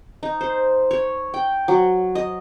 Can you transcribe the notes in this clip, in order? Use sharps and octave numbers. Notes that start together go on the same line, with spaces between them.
D#4
C5
C#5
G5
F#3
D#5